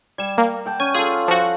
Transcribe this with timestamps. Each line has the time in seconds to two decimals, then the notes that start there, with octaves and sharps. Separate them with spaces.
0.18 G3 G#6 E7
0.38 A#3
0.65 F#5 G5 A5
0.80 C#4 G#5
0.94 F4 G#4 A4
1.28 F3 F#4